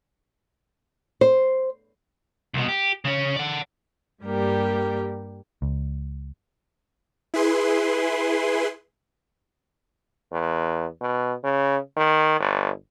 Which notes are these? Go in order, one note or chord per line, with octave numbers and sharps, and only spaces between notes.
C5
C2 B2
G4
C#3 C#4
D5 F#5
G2 G3 A#3 G4 A#4
C#2
E4 G#4 B4 C6
E2
B2
C#3
D#3
G1